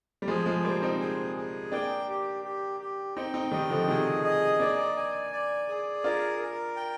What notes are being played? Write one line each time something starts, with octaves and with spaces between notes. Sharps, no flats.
G3
F3 G#3 G#4
F3 G#3
G3 A#3 C5
C4 D#4
G#4
G#4
A#3 D4 G5
G4
G4
G4
C4 D#4 G5
C4 D#4
D#3 G3 D#5
D3 F3
C3 D#3 G#4
D#5
A#3 D4 D5
G#5
D5
G#4
D4 F4 A#4
A#4
G5